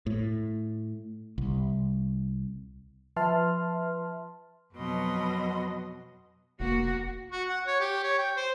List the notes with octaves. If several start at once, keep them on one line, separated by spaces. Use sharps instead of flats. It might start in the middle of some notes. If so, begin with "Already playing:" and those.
A2
C2
F3 B4 E5 A5 C6 F6
F2 B2 F#3 F#4 D#5 C6
F1 A#3 F#4
F#4
F#5
C#5
G4
C#5
G5
C5